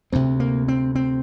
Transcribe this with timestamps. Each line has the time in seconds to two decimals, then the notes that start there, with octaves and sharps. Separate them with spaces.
0.12 D2 C3 C4
0.40 A#3
0.68 C4
0.95 C4